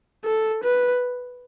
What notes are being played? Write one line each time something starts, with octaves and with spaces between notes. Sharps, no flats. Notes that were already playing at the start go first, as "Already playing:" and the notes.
A4
B4